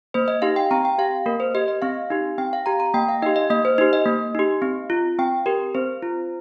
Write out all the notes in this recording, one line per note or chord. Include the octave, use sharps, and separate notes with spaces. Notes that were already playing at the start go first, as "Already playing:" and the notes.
A#3 C5
D#5
D#4 G4 F5
G5
C4 A#5
G5
G4 F5
A#3 A#4
C5
G4 D#5
D#5
C4 F5
D#4 G4
C4 G5
F5
G4 A#5
A#5
A#3 G5
F5
D#4 G4 D#5
D#5
A#3 D#5
C5
D#4 G4 C5
D#5
A#3
D#4 G4
C4
F4
C4 G5
G4 A#4
C4 C5
F4